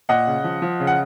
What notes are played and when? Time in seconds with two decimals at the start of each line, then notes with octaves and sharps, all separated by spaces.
0.09 A#2 D#5 F#5
0.27 C#3
0.44 F3
0.62 F3
0.80 C#3
0.87 F#5